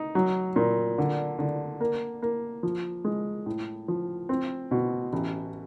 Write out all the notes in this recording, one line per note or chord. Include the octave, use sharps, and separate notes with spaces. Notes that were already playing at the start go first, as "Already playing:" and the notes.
Already playing: D#4
F#3
A#2
D3
D3
A#3
A#3
F3
G#3
A2
F3
C4
B2
A1